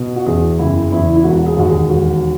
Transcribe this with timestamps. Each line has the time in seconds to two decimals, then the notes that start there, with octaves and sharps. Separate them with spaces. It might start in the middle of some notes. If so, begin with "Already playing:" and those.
Already playing: B2
0.16 F#4
0.26 E2 G#4
0.59 F#1 E4
0.92 E2 E4
1.16 E4
1.24 E1 F#4
1.46 G#4
1.57 D#2 F#4
1.68 G#4
1.90 E1 F#4